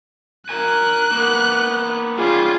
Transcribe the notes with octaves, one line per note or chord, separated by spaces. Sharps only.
A#4 G#5 F#6
A#3 B3
G3 C#4 F4 G#4